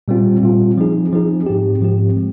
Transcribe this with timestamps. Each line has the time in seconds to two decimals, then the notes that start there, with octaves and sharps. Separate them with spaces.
0.08 A#2 G3 C4 F4
0.43 A#2 G3 C4 F4
0.78 F3 C4 D#4 G#4
1.13 F3 C4 D#4 G#4
1.46 G#2 F3 C4 G4
1.81 G#2 F3 C4 G4
2.16 F3 G#3